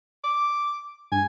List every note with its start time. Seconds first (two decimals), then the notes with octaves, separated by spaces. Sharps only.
0.24 D6
1.12 G2 G#5